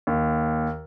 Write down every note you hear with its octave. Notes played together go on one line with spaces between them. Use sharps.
D#2